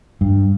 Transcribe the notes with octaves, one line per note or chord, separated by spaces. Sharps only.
G2